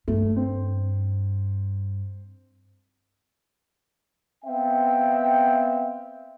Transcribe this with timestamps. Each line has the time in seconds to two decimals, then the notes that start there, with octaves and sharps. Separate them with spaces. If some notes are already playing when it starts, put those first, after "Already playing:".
0.08 G2 A3
0.36 C4
4.44 B3 C4 E5 F5 G5